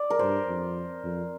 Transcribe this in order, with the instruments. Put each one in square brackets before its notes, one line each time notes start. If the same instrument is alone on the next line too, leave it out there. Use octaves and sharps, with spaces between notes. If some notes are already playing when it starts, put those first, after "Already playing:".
Already playing: [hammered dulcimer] D5
A#4
[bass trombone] G2 [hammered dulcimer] C5
[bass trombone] F2
F2